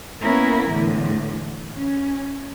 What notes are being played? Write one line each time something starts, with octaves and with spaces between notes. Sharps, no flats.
A#3 B3 C#4 E4 A#4
E2 A2 D3
C#4